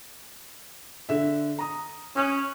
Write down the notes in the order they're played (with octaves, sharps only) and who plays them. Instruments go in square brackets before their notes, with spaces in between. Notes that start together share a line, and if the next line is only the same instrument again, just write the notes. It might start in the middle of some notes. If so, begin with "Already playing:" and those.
[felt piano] D3 E5
A#5 D#6
[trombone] C#4 [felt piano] D#6 F#6